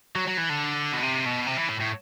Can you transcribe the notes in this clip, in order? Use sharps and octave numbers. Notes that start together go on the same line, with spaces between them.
F#3
F#3
E3
D3
B2
C3
B2
C3
E3
A2
A2